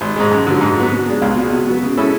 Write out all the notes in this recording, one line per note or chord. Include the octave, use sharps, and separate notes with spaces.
G#1
G#2 G#3
F#2
D3 F#3
G#2
F#3 B3
B2
G#3 D4
C#2
B2 G#3
B2
F#3 B3
C#3
G#3 C#4 E4 A4